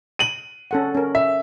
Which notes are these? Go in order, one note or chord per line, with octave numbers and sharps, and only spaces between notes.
D#7 F#7
C#4 A4 F#5
C#4 A#4
E5